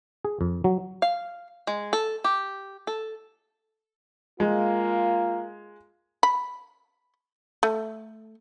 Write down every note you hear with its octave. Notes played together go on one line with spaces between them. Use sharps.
G#4
F2
F#3
F5
G#3
A4
G4
A4
G#3 A#3 F4
B5
A3